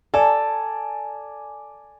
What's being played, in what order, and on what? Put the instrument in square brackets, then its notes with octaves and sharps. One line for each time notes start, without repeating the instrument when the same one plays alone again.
[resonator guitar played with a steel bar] A4 [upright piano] D5 G#5